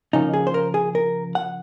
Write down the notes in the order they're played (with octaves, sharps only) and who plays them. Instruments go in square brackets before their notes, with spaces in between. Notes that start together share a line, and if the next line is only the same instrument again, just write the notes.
[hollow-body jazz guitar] C#3 F3 A#3 C#4 D#4
G#4
C5
A#4
G#4
A#4
F#5